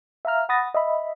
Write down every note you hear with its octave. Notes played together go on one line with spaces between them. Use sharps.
E5 F5 A#5 F6
F#5 B5 D#6 A6 A#6
D#5 E5 B5